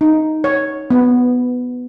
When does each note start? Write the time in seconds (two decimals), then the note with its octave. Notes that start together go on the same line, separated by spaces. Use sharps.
0.01 D#4
0.44 C#5
0.91 B3